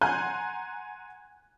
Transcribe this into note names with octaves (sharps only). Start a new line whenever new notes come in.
F#5 G#5 A#5 C6 F#6 G6